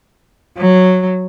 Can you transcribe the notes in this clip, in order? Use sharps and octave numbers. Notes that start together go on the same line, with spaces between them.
F#3